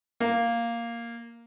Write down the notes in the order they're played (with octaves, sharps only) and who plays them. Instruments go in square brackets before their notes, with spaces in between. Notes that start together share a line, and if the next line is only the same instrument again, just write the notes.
[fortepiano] A#3